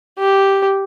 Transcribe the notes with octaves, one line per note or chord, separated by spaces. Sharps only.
G4